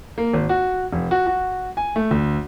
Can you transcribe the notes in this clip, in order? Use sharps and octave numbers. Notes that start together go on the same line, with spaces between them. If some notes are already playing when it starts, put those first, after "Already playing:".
A#3
G#1
F#4
F1
F#4
F#4
G#5
A3
D2